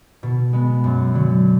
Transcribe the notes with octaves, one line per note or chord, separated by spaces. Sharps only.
B2
G#3 B3
F#2
D3 F#3